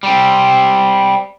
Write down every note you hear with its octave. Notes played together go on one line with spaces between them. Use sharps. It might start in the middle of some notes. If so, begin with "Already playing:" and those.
G3 C4